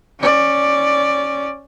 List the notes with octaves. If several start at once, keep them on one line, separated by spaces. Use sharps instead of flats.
C#4 D5